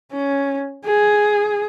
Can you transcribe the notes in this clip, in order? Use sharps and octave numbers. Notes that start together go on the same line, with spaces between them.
C#4
G#4